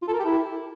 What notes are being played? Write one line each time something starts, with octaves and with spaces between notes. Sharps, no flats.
F4
A4
A#4
G4
E4